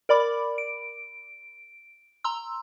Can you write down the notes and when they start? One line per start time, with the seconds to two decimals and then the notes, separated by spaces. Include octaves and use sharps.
0.09 A#4 D5 B5 D6
0.58 D7
2.24 A#5 C6 E6